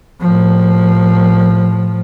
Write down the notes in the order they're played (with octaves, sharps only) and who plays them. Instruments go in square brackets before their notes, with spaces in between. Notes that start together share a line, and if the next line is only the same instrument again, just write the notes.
[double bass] A2 F3